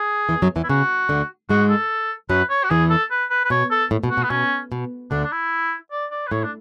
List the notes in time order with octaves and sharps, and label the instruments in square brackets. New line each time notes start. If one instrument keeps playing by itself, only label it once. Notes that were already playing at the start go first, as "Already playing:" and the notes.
Already playing: [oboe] G#4
[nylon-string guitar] E2 E3
F#2 F#3
E2 E3
[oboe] E4
[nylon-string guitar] C#3 [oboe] F#4
[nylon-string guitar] D2 D3
[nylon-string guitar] G#2 G#3 [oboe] F#4
[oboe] A4
[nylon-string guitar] F#2 F#3 [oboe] B4
[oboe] C#5
F#4
[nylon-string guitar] E2 E3 [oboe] G#4
[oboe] A4
B4
B4
B4
[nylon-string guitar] B2 [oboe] C#5
[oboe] A4
[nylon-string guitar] A2
B2
[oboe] F#4
[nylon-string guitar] B2
[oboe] B3
[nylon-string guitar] B2 [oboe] C#4
[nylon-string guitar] B2
[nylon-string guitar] D2 D3 [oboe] D4
[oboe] D4
E4
D5
D5
B4
[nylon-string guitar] A2 [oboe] C#5
[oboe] D4